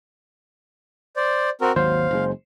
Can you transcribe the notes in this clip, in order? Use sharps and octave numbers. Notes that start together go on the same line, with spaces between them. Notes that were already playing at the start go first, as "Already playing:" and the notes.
C5 D5
C4 F#4 A#4
G#1 D#2 F#3 C5 F5
F#1 C#3 G#3